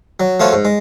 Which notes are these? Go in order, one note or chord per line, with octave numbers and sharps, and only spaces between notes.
F#3
F3 A3 F4 F#4 C#5
G#2
G#3